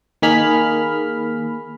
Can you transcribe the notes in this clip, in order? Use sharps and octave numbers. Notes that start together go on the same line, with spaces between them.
D#3 A#3 G#4 B5 F6